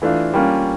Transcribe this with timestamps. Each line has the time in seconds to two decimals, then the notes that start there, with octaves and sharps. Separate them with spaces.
0.02 E3 A3 D4 F4
0.34 G3 A#3 C#4 F4